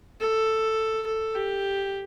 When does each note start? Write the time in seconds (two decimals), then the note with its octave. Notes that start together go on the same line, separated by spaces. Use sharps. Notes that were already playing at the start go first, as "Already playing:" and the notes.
0.21 A4
1.07 A4
1.35 G4